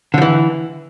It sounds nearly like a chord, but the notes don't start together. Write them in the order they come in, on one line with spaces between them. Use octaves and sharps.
D3 F3 E3